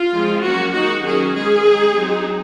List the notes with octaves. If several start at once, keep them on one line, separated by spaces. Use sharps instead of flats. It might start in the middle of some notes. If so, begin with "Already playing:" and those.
Already playing: F4
F3 G#3 C4
F#3 A#3 C#4 F#4
D#3 G#3 D#4 F#4
D#3 F#3 C#4 G#4
G#3 C#4 G#4
G#3 D#4
F#3 C4 D#4